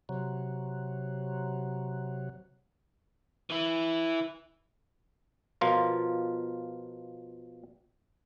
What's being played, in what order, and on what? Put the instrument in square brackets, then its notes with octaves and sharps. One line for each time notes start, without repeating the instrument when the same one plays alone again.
[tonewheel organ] C3 F#3
[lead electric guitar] E3 E4
[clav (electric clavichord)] B2 F3 F4 A#4